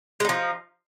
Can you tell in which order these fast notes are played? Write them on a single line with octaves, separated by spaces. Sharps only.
G#3 D#4 F3